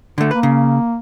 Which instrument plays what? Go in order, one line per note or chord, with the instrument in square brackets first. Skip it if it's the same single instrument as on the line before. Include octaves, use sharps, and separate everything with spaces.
[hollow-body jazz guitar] D3 A3
[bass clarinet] A#3 [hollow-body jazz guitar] B4
[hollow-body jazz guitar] C#3